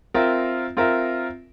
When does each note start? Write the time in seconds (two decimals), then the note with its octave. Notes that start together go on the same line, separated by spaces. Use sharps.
0.14 C4 F4 A#4 E5
0.77 C4 F4 A#4 E5